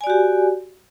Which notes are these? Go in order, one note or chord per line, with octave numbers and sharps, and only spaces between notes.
F#4 G4 D5 G#5